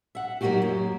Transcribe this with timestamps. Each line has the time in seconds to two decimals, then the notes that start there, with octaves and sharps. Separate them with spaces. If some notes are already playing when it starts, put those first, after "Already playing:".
0.15 E5 F#5
0.41 F#3 A#3 C#4 D#4 F#4 G4
0.62 F#2